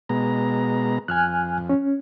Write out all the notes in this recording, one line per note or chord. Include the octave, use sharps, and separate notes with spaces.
B2 G#3 A#5
F2 G#5 F6 F#6
C#4